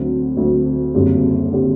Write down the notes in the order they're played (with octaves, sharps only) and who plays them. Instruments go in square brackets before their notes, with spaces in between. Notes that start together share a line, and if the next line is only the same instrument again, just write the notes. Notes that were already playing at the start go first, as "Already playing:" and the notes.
Already playing: [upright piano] D2 D3 F#3 C4
D2 D3 F#3 C4
F#1 F#2 D3 G3 C4
D3 G3 C4